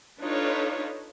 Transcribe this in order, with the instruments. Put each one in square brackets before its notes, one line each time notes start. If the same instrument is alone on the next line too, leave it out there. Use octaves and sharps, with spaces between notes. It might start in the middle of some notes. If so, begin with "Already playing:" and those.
[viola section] D4 D#4 F4 A4 B4 C#5